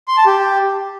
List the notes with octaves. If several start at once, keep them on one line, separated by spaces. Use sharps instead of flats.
C6
A5
G4